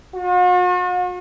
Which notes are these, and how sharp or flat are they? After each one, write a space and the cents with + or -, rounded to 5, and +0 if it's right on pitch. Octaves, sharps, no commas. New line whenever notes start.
F#4 -45